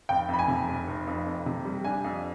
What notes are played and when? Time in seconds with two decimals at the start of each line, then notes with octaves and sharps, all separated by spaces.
0.09 F1 G5
0.29 F2 B5
0.39 G#5
0.48 C3
0.68 F1
0.88 F1
1.07 F2
1.26 F2
1.46 C3
1.65 G3
1.84 D4 G#5
2.04 F2